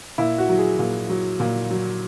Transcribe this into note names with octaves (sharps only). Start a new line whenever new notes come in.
A#2 E4
F#4
F#3
G#4
A#2
F#3
A#2
F#3